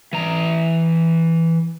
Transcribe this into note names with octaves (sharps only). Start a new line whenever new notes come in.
E3 A#5